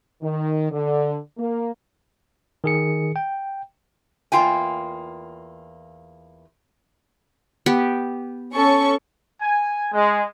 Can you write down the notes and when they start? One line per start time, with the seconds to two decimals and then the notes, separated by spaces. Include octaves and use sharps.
0.21 D#3
0.72 D3
1.38 A#3
2.64 D#3 G#4 C#7
3.16 G5
4.32 E2 A#3 F4 G5 G#5
7.66 B3 G4
8.53 C#4 A4 C#6
9.41 G#5
9.92 G#3